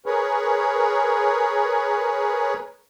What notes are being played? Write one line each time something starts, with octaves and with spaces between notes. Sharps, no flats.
G#4 A#4 B4 C#5